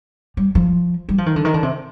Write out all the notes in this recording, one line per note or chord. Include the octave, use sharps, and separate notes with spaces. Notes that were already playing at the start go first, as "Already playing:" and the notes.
G3
F3
G3
F3
D#3
D3
D#3
D3
C3